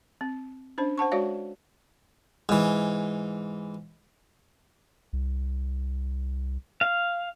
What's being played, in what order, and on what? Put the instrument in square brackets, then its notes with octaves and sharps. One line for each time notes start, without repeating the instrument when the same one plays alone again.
[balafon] C4
C#4 D4 C5
C5 F#5 A5 C#6
G#3 F#4 C#5 D5 F5
[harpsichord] G#2 E3
[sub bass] C2
[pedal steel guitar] F5